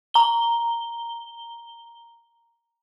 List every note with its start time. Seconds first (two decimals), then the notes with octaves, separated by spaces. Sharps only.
0.14 A#5 G7